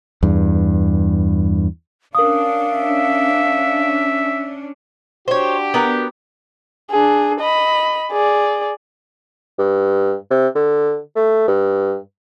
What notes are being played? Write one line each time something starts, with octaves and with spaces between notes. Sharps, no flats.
E2 G2
C#4 D4 A#4 F5 D#6
E5
D4 F#4 G4 C5 C#5
B3 A#4 F#5
D4 G#4
D#5 B5
G#4 D5
G2
C3
D3
A3
G2